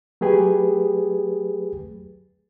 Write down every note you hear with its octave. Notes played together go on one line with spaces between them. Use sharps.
F#3 A3 G4 G#4 B4